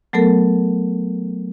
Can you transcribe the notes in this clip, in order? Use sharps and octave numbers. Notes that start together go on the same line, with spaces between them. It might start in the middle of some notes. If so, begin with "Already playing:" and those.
F#3 A3 B3 A4 A#4